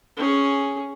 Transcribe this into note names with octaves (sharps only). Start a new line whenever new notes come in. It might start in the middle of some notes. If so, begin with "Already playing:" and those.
C#4 G#4